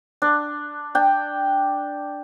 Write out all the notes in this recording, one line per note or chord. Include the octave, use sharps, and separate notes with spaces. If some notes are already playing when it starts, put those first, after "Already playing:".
D4
D4 G5